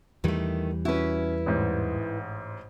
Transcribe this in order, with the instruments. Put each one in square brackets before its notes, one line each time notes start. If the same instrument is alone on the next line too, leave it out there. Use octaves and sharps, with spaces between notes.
[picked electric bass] E2 E3 G3 [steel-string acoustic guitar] D#3 A3
[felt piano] C#4 F#4 [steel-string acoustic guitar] E4 B4
[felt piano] A1 G#2